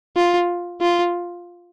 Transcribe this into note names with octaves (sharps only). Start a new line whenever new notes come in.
F4
F4